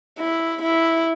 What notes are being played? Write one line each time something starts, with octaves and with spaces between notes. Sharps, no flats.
E4
E4